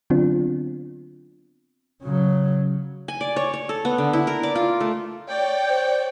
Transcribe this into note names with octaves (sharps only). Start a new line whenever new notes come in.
D3 F#3 B3 C4 D4 F4
C#3 F#3
G#5
D5
C#5
C#5
A4
B3
D3
E4
A#4
D5
F4
A3
C#5 D5 G5
C5